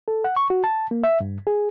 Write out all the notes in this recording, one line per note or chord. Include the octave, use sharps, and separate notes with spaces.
A4
F#5
C#6
F#4
A5
A#3
E5
G2
G#4